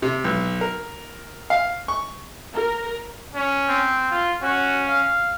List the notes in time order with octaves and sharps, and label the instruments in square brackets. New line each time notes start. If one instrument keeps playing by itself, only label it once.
[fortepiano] C3
B1
A#4
F5
C#6
[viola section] A#4
[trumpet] C#4
[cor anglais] C4
[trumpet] F4
[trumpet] C#4 [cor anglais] F#4
[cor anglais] F5